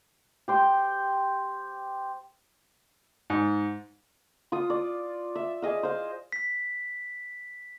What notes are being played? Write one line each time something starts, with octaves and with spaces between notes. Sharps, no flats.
G4 C5 G5
G#2
F4 D#6
D5
E5
G#4 D#5 F5
C5 F5
B6